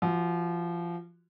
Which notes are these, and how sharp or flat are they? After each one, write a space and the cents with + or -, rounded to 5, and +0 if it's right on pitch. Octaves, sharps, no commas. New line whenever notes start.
F3 -25 F#4 -5